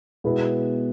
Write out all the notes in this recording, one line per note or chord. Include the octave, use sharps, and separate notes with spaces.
B2 G#3 B3 E4 B4